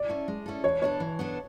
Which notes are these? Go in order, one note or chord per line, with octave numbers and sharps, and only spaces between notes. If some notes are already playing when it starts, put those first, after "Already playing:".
Already playing: D5
C#4 E4 A4
G#3
C#4 E4 A4
E3 C#5
B3 D4 A4 C#5
E3
B3 D4 A4